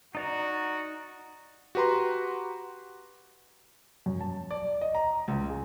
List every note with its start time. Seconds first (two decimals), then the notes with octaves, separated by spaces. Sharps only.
0.15 D#4 F#4 D5 A#5
1.75 F#4 G4 B4 A#5 C6
4.06 F#2
4.21 A5
4.51 D5
4.81 D#5
4.95 A#5
5.28 C#2
5.49 G#4